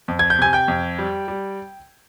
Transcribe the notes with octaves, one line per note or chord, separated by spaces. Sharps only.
F2
G#6
G6
C3 G#5 G#6
G5 G6
F2
G3
G3